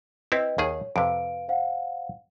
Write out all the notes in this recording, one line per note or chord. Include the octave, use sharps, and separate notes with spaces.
C4 E4 B4 D#5 G5
D#2 D#3 G#4 C#5
F2 C3 B4 F5 D7
C5 F5 F#5